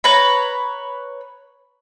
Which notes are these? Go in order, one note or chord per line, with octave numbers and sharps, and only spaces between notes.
B4 C#5 A#5 B5